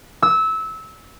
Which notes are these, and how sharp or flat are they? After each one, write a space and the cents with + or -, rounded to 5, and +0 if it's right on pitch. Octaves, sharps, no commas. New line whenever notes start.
E6 -20